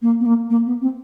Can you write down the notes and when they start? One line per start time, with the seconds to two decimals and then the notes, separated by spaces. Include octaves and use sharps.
0.02 A#3
0.20 B3
0.26 A#3
0.50 A#3
0.66 B3
0.82 C4